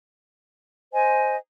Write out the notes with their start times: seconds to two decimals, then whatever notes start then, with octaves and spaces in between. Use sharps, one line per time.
0.92 C5 D#5 G#5